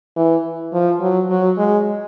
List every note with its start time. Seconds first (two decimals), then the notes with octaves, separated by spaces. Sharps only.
0.16 E3
0.73 F3
1.01 F#3
1.29 F#3
1.58 G#3